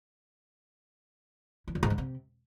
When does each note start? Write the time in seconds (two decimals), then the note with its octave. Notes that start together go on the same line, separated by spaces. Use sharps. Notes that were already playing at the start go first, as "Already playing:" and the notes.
1.68 E3
1.75 E2
1.83 G#2
1.90 D3
1.98 C3